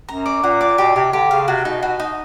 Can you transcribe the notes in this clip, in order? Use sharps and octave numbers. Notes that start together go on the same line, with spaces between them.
F#2 A#5
D5
A#2 F#5
D5
B2 G4
C3 G4
D3 G4
C#3 F5
C3 F#4
B2 D#4
B2 F#4
D#4